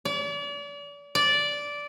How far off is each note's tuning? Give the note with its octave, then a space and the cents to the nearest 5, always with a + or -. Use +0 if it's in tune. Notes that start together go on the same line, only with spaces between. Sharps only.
D5 -40
D5 -10